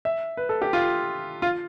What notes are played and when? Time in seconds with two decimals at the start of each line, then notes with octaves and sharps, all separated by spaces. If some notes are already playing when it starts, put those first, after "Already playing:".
0.05 E5
0.37 B4
0.49 A4
0.62 G4
0.73 F4
1.42 F4